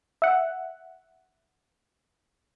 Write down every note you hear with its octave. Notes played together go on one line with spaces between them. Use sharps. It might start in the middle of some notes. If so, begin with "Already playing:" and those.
E5 F#5